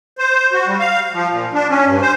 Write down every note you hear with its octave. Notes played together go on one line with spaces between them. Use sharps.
C5
F#4
G3
F5
F3
A#2
D4
C#4
G2
C5